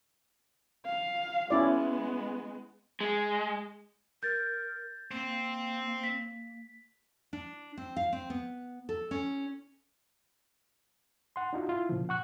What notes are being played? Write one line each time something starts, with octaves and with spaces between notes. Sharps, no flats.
F5
G#3 B3 C#4 E4 D5
G#3
A#4 G6 A6
A#3 C4
B6
D4
C4
F5
C4
B3
A4
C#4
F#5 C6
D4 D#4 F4 F#4
E4 F4
A#2 C#3 F3
F#5 C#6 F#6